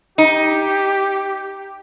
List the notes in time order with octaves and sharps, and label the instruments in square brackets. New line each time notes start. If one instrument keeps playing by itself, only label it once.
[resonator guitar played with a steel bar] D#4 [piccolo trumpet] G4